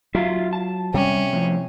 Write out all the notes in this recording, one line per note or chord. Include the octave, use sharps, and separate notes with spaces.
F#3 F4 E5 F5
A5
C3 G3 C#4
A2 F3